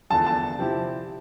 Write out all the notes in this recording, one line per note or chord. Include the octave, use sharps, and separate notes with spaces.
E2 D3 F3 A5
A5
C3 F3 C4 E4 G4